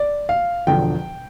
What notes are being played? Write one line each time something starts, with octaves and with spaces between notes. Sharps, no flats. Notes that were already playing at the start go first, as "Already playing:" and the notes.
Already playing: D5
F5
E1 E2 D3 F3 G5